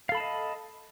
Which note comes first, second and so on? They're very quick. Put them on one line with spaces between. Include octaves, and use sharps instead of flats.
F5 A4 B5 A5 D#5